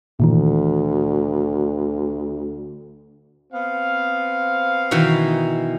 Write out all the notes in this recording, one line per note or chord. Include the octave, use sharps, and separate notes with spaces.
D2 A#2 D#3 E3
B3 C4 F5
B2 D#3 E3